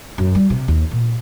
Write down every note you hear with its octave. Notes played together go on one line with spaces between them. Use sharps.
F#2
G3
C3
D#2
A#2